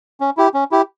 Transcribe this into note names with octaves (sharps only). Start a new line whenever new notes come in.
C#4
E4 G4
C#4
E4 G4